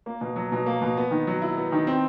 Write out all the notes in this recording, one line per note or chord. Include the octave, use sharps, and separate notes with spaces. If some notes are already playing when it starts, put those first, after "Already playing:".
A#3
B2
F#3
B2
A#3
B2
B3
D#3
F#3
E4
B3
D#3
C4